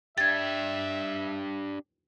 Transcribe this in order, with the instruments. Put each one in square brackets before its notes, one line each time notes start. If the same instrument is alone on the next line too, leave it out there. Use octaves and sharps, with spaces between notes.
[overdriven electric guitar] D4 G4 [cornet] E5 [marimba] G#6 A6